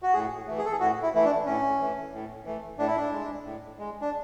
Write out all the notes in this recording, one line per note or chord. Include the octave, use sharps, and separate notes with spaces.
F#4
A2 G#4
E3 A3
G#4
A4
G#4
A2 F#4
E4
E3 A3 E4
D4
A2 C#4
E3 A3
A2
E3 A3
A2 D4
E4
D4
G#3
A2
G#3
D4